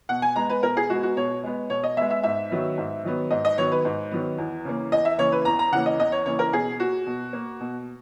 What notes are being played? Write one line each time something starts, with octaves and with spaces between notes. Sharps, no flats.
B2 F#5
G#5
G#3 B3 A#5
B4
B2 A#4
G#4
G#3 B3 F#4
F#4
B2 C#5
G#3 B3
B2 C#5
D#5
G#3 B3 E5
E5
G#2 E5
D#3 F#3 B3
G#2
D#3 F#3 B3
G#2 D#5
D#5
D#3 F#3 B3 C#5
B4
G#2
D#3 F#3 B3
E2
C#3 E3 A#3
E2 D#5
E5
C#3 E3 A#3 C#5
B4
E2 A#5
A#5
C#3 E3 A#3 F#5
D#5
E2 D#5
C#5
C#3 E3 A#3 C#5
A#4
B2 G#4
A#3 F#4
B2
A#3
B2